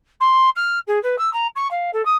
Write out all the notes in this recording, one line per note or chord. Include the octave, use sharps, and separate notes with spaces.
C6
F6
G#4
B4
E6
A#5
C#6
F5
A4
D#6